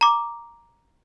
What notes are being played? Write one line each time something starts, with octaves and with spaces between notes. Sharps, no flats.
A#5 D6